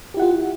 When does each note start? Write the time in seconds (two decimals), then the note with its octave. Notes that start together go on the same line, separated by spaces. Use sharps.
0.14 G4
0.17 E4
0.20 F#5
0.22 F4